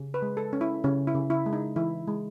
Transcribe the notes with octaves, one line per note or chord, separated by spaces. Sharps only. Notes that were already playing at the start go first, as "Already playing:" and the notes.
Already playing: C#3
B4
G#3
A4
C#4
E4
C#3 C#4
E4
C#3
E4
G#3
D#4
E3 E4
G#3